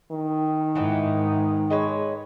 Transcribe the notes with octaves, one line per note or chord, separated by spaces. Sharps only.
D#3
G#2 E3 B3 D#4
G#3 B4 C#5